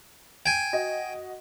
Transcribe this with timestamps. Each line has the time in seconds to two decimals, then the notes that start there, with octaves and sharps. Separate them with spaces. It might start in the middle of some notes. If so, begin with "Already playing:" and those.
0.46 G5 G#5
0.73 F#4 D#5